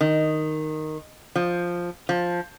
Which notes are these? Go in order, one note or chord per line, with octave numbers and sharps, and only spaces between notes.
D#3
F3
F3